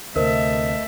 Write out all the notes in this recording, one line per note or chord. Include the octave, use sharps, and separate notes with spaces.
D2 C3 A3 A#4 C5 D#5 E5